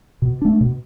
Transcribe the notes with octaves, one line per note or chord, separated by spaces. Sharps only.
B2
A3 D4
B2